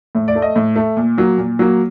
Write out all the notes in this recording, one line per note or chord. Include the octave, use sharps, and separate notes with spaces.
A2
D5
A3
D#5
A2
A3
A#2
F#3 A#3
A#2
F#3 A#3